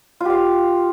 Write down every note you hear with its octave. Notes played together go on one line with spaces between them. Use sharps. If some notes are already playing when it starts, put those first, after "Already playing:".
F4 G4 F5